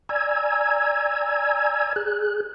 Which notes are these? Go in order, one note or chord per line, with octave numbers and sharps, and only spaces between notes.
D5 G#5 A#5 E6 G#6
G#4 F#6